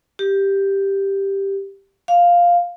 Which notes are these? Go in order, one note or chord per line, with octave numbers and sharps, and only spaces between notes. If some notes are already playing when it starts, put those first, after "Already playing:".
G4
F5